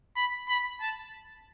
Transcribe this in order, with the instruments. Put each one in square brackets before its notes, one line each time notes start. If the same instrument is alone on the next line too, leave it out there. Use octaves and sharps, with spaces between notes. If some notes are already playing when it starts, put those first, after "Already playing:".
[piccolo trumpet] B5
B5
A5